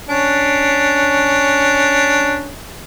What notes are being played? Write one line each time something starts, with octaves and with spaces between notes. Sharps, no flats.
C#4 D4